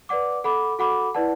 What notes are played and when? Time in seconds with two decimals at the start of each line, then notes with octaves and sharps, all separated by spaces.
0.09 B4 D5 F#5 D6
0.44 A4 F#5 B5 D6
0.79 F#4 A4 F#5 B5 D6
1.14 E4 B4 D5 F#5 A5